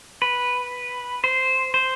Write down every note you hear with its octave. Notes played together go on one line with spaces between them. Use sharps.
B4
C5
C5